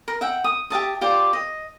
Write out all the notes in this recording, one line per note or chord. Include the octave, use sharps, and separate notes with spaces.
A#4
E5 F#5 G5
D#6
G4 E5 A5 D#6
F4 G4 C5 D5
D#5